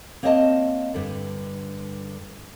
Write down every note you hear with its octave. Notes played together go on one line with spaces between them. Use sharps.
A#3 C4 C#5 D#5 F5 A5
G2 D3